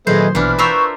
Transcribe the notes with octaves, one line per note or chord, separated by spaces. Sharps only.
A#2 D#3 F#3 A3 G#4 B4 C5 D#5
A#1 B2 E3 D4 B4 F6
F4 A#4 E5 B5 C#6 E6 G6